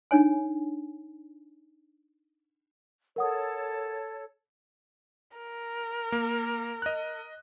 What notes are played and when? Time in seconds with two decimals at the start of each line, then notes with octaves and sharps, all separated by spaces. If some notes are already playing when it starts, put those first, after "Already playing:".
0.11 D4 D#4 C#5 G#5
3.16 A4 A#4 C#5 F#5 D#6
5.37 A#4
6.12 A#3
6.82 D#5 F#6